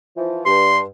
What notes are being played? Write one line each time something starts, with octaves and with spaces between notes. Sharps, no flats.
E3 F3
G2 C6